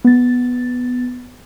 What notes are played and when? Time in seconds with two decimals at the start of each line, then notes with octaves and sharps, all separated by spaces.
0.04 B3 A6